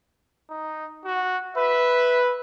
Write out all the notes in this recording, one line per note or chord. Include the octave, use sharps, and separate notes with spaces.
D#4
F#4
B4 E5